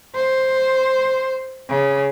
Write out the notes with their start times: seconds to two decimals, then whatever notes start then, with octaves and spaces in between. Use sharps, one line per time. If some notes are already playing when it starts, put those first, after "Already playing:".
0.15 C5
1.69 C#3